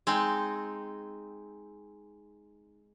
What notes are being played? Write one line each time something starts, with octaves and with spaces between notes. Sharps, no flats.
G#3 C4 D#4